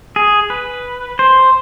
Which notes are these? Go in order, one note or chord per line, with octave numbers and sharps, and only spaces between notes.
G#4
B4
C5